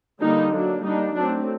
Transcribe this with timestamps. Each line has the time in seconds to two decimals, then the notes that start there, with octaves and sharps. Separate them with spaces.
0.20 D3 G3 A#3 D#4
0.52 F#3 A#3 D4
0.84 G3 A#3 D4 D#4
1.14 F#3 A3 C4 D4